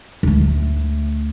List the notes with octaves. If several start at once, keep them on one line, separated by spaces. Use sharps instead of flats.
D2 A3